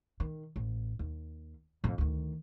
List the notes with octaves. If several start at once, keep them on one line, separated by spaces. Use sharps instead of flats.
D#3
A1
D#2
F2 A2
D2 D#3